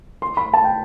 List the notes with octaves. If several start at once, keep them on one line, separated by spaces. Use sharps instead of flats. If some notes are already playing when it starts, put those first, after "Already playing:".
C6
B5
A5
G5